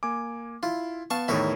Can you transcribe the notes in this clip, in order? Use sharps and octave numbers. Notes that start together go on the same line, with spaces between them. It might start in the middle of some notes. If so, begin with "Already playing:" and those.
A#3 G#5 D6
E4 F4
B3 F5 A5 C#6
E2 A2 D#3 E4 A#4 C#5